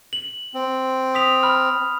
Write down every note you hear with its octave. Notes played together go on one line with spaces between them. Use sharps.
F#7
C4
D#6 B6 F7
B5 F6